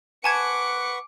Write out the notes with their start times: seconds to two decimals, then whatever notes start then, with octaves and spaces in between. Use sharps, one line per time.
0.24 B4 F#5 G#5 A5 C#6 D6 G#6 C#7